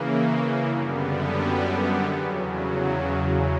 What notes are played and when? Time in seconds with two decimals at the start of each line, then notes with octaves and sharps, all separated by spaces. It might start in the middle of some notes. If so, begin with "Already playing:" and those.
Already playing: C#3 E3 A#3
0.67 F#2 D3 G3 B3
2.03 E2 C#3 F#3